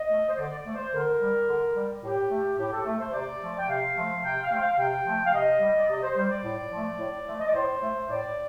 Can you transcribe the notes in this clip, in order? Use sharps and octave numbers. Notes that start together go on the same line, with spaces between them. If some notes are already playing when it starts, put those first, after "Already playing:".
Already playing: D#5
A3
C5
D3 D5
D5
A3
C5
D3 A#4
G3
D3
G3
A2 G4
A3
A2 G4
A4
A3
C5
C3 D5
F3 A3
G5
C3 F5
F3 A3
C3 G5
F5
F3 A3 G5
F5
C3 G5
F3 A3
F5
C3 D#5
G3
D5
C3 D#5
C5
G3 C5
D5
A2
F3 A3
A2
F3 A3
D#5
D5
A2 C5
A3
A2 D5